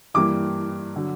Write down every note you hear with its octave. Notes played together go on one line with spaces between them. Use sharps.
G2 E3 G3 A#3 D6
D3 F#3